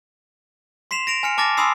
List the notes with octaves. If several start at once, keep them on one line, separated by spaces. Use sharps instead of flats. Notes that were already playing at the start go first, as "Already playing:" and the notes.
C6 B6 C7 E7 F7
A#6 D7 F7
G#5 F6 C#7
A5 D6 F6 A6 A#6
G#5 B5 C6 D#6 E6 C7